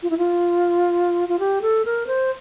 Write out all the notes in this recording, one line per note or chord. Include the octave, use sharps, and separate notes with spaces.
F4
E4
F4
F4
G4
A4
A#4
C5